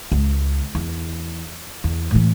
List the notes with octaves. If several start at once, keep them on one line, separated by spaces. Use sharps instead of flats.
C#2
E2
E2
A2 E3